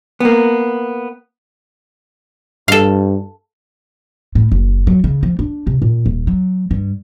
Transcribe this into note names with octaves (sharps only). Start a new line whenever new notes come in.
A#3 B3
G2 A4 F5
A2
F#1
F#3
C#3
F3
D4
C3
A#2
D#1
F#3
G2